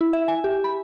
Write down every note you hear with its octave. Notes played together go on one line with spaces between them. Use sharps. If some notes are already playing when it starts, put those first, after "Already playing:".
E4
E5
G#5
G4
B5